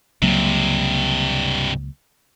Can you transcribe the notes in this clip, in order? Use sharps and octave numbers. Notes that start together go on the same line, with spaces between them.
C#2 G2 C3 F#3 A#3